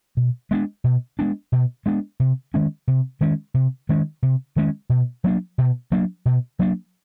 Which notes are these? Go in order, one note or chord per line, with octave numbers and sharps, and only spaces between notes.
B2
G#3 B3 D4
B2
G#3 B3 D4
B2
G#3 B3 D4
C3
D#3 G#3 C#4
C3
D#3 G#3 C#4
C3
D#3 G#3 C#4
C3
D#3 G#3 C#4
B2
F#3 A#3 D4
B2
F#3 A#3 D4
B2
F#3 A#3 D4